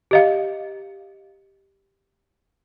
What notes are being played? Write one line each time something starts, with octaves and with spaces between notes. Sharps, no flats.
G4 D#5 F5